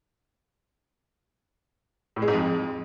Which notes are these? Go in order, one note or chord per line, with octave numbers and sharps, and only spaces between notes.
A2
G#3
G#2
F2